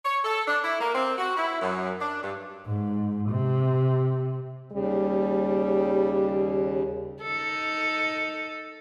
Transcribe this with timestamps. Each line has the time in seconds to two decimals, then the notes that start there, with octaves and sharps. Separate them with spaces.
0.05 C#5
0.25 A4
0.48 D4
0.64 E4
0.81 A#3
0.95 C4
1.18 F#4
1.37 E4
1.62 F#2
2.01 D4
2.22 G2
2.66 G#2
3.30 C3
4.72 D#2 C#3 G3
7.22 D#4 A4